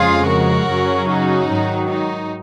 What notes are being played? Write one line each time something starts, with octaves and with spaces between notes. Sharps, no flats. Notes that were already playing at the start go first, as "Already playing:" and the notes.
Already playing: F2 C#3 G#3 F4 G#4
F#4 A#4
F#2 C#3 F#3 C#4
D#4 F#4
G#2 D#3 F#3
D#4